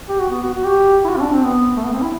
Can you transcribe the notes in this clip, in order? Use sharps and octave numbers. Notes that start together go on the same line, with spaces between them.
G4
F#4
B3
F#4
F#4
G4
E4
F#4
C4
D4
C4
B3
A3
B3
C4
E4